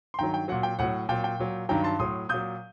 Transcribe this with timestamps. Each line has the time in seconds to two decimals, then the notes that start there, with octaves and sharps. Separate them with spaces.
0.14 C6
0.19 G2 D#3 F#3 G5 A#5
0.34 G5
0.48 A#2 F#3 F#5
0.63 G5
0.79 A2 F#3 F#5
1.09 A#2 F#3 G5
1.24 G5
1.39 A#2 F#3
1.69 G2 D#3 F#3 G5 A#5
1.84 A5 C6
1.99 A2 F#3 C6 D#6
2.29 A#2 F#3 D#6 G6